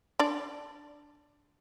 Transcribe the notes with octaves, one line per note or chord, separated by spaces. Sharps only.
D4 D5